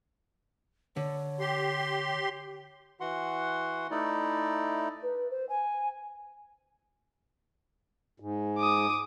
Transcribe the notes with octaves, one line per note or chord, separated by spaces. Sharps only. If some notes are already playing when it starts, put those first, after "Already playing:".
D3 C#5
G4 C6
E3 F#4 F#5 C6
A3 D#4 E4 D5
B4
C5
G#5
G#2
D6 D#6